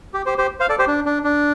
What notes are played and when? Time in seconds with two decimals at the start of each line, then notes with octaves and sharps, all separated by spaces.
0.14 G4
0.26 G4 C5
0.38 G4 C5
0.60 C5 F5
0.69 A4 D5
0.79 G4 C5
0.87 D4
1.06 D4
1.24 D4